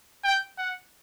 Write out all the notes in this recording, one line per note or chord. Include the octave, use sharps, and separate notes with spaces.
G5
F#5